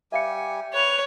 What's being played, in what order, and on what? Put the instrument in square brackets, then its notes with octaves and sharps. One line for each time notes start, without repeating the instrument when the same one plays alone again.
[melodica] G3 G4 G#5 [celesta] E5 F5 C#7
[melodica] B4 [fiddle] C#5 [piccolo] F7